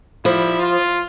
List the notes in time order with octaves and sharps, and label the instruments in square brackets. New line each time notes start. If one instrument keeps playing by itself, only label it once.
[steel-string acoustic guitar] F3 [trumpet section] G3 E4
[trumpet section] F4